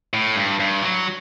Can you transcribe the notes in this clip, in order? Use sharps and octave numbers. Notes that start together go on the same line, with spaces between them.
A2
G2
G2
F#3